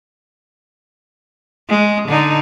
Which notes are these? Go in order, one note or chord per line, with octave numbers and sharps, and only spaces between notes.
G#3
D3 D#4